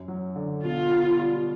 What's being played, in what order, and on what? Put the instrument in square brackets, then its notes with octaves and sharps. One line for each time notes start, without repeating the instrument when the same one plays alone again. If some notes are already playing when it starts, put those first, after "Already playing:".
Already playing: [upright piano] F#2
F#3
D3
[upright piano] B2 [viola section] F4
[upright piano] B3
G3